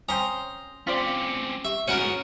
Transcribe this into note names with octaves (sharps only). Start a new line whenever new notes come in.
C4 C#4 A#5 C6 D#6 F6 G6
C4 C#4 F4 C5 D5 D6 B6
G4 E5 C#6
G#2 B2 C#4 F#4 A#4 C#5 D7